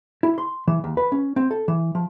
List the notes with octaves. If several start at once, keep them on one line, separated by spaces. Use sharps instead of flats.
E4
C6
E3
D#2
B4
C#4
C4
A4
E3
F3